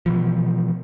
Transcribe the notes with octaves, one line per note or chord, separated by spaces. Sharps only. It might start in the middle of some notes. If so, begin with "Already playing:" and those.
B2 E3 F3